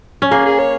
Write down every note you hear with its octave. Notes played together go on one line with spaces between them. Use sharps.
C#4
A#3 G#4
G#4
C#5